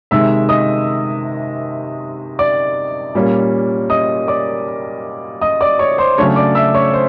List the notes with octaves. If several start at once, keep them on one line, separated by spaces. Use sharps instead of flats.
C3 D#3 G#3 E5 E6
D#5 D#6
D5 D6
A#2 G3 A#3 C#4
D#5 D#6
D5 D6
D#5 D#6
D5 D6
C#5 C#6
C5 C6
C#3 F#3 A3 D4 C#5 C#6
D5 D6
E5 E6
C#5 C#6
C5